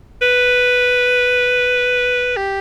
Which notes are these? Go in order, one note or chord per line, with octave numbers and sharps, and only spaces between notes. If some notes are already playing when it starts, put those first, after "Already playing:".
B4
G4